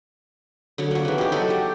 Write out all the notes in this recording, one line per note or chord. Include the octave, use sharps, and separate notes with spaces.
D3 F#3 C#5
A#3 F#4
C#3 E3
D#4 G4
F#3 F#4 A4 D#5
G4